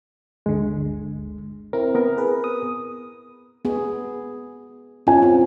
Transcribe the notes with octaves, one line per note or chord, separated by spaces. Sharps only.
G1 D2 D3 G#3
C4 E4 A#4
B3 A#4
G#4 B4
D#6
B3 G#4
C#4 F4 G#5
C4